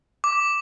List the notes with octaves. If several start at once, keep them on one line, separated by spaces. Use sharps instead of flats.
D6